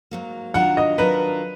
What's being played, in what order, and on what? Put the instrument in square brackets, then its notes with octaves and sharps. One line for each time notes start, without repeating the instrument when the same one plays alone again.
[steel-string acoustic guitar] G#2 F#3 A#3
[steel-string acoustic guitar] D#3 F#3 D4 F4 A#4 [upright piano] F#5
[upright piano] D#5
[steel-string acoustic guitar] D#3 F#3 D4 F4 A#4 [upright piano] B4